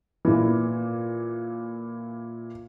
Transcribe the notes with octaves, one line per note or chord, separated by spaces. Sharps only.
A#2 E3